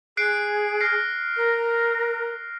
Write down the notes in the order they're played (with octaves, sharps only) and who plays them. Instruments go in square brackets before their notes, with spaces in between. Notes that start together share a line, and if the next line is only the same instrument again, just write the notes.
[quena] G#4 [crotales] F#6 C7 D7
[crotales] F6 A#6 C7
[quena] A#4